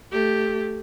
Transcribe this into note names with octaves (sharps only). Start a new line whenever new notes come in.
A3 G4